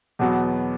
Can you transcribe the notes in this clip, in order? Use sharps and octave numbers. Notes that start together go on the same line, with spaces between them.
E2 B2 F#3 B3